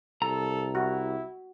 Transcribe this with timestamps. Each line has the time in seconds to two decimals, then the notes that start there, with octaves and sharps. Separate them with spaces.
0.22 C2 A4 A#5
0.75 E4 F#4